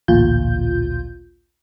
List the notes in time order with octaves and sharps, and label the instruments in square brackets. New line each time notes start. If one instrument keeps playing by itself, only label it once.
[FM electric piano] A1 D2 A#2 F4 G6